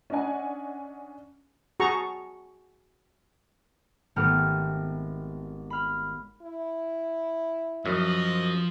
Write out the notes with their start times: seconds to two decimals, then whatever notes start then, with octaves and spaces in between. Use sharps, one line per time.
0.10 C#4 D4 D#5 F#5 G#5
1.80 F#4 G#4 A5 A#5 C#6
4.16 G#1 A3 B3 G4 F6
5.70 B5 F6
6.42 E4
7.86 F#2 F3 D#5